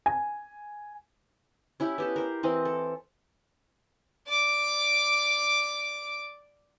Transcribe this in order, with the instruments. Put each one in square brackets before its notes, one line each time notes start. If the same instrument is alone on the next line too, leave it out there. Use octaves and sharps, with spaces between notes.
[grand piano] G#5
[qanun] C#4 E4 G4
B3 G4 A4
A#4 C5
E3 C4 D#5
A4
[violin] D5 D6